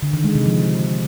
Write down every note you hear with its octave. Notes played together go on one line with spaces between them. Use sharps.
D3
D#3
G#3
C3
F3